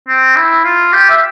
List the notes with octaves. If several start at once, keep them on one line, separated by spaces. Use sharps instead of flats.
C4
E4
F4
G4
E5